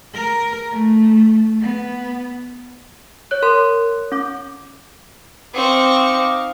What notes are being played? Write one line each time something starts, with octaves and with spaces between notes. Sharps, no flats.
A#4
A3
B3
C#5 F#6
A#4 C6
C#4 D6
C4 D#4 F5 C#6 D6